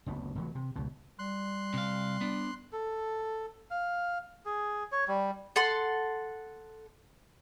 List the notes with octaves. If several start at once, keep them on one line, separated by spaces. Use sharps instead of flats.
F#1 D2 B3
F1 E3 F#3
C3
C#2 B2
G3 C6 F#6
C3 F5
B3 D4
A4
F5
G#4
C#5
G3
A4 F#5 C6